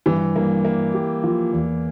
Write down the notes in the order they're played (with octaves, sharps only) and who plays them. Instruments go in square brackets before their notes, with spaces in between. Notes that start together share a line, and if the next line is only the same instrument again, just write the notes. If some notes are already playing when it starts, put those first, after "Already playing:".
[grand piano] G2 [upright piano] E3
[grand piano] G2 [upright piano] A#3
[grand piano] G3 [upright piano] A#3
[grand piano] G4
F3
E2